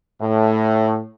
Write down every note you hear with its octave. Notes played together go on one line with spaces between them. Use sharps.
A2